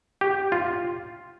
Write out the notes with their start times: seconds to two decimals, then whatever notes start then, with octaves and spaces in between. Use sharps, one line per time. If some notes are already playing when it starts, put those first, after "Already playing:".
0.21 G4
0.52 F4